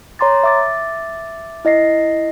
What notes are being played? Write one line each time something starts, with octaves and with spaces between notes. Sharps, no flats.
C#5 A#5 C6 D6 A6
E5 D6 A6
E4 D#5 A#6 C7